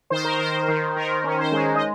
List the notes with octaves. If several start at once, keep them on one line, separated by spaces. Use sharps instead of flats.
D#3 C5
A#4
D#3 C5
D#3
D#3 A#4
C#4
C5
G#3
D#5